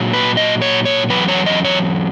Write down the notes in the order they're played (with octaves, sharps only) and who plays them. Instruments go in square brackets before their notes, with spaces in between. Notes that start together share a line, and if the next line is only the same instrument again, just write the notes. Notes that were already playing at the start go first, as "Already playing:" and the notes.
Already playing: [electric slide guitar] A#2 F#3
B4
D#5
C#5
C#5
E2 B2 F#3 B4
C#5
D#5
C#5